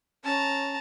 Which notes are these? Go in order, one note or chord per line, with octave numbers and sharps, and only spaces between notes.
C#4 A5 A#5